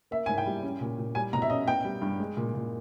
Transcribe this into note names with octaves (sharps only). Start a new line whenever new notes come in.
A#3 E5
G#2 G#5
G5
G3
C#4
A#2
A#2
G3 G#5
B2 A#5
E5
C#4 D#5
B3 G5
G3
G2
G#3
A#2
A#2